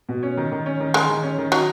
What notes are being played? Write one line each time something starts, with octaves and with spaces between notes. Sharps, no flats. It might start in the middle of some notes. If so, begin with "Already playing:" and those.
B2
C#4
D#3
D#3
C#4
D#3
D#3 G#3
D#3
C#4
D#3
F#3 D#4